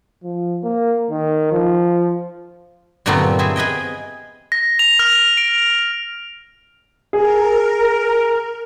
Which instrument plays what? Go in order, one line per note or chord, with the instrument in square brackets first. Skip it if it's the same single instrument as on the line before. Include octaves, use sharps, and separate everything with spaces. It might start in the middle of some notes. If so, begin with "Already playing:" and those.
[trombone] F3
A#3
D#3
F3
[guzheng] G2 A#2 D3 F#3 B3 C4
C4 E4 G#4 E5
G#4 B4 D#5 G5
[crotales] A#6
F7
F6
D7
[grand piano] G#4 [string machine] A#4